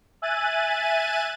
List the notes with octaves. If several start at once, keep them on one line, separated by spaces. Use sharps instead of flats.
E5 G#5 F#6 A6 D#7